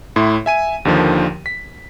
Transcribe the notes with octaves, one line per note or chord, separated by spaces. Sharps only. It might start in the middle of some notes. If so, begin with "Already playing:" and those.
A2 E4 C6
E5 G#5 D#7
D#2 D3 D#3 F3
B6